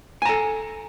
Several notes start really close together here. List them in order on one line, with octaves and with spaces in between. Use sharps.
G#5 A#5 A4